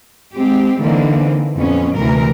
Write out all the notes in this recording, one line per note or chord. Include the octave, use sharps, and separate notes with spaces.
G#3 C4 G4
D3 E3 A#3 C4 D#4
F2 A#2 B3 C#4
D2 C3 E3 A#4